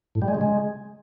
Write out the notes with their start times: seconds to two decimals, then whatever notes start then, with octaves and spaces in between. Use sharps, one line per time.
0.15 A2
0.22 G3
0.28 G#3
0.35 C#3
0.41 G#3